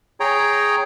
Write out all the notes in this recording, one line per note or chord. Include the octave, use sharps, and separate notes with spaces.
G#4 C#5 G5 A#5